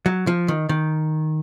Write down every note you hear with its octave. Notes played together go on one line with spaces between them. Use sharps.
F#3
F3
D#3
D#3